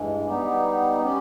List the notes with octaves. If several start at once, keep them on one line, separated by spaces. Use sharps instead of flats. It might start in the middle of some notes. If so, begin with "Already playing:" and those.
Already playing: G2 E3 G#3
G3 B3 D#4 G4
G3 C#4 G4